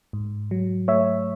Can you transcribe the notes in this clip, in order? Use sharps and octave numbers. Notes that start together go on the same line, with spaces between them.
G#2
F#3
A3 C#5 E5